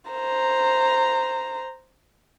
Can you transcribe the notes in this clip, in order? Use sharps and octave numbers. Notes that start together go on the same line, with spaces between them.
C5 A#5